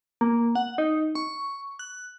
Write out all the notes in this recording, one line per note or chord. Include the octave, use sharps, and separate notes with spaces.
A#3
F#5
D#4
C#6
F#6